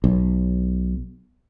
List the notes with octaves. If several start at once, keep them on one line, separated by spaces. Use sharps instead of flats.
B1